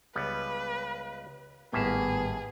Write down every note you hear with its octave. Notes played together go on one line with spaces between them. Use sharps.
C#2 G3 B3 B4
G#1 A2 G3 A#3 B3 G#4 E5